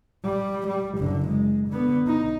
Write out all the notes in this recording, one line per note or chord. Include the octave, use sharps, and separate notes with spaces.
G3
G3
F#1 D3
G#3
D3 B3
D#4